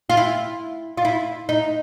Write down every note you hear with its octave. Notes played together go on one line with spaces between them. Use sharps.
F4
E4
F4
E4
D#4